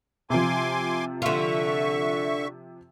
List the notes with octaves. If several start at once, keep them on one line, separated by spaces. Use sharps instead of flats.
C3 F3 G#5 C6 D6
D3 F4 E5 C#6